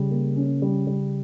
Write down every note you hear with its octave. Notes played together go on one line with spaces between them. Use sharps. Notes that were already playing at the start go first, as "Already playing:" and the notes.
Already playing: C#3 G3
A#3
C#4
G3
G3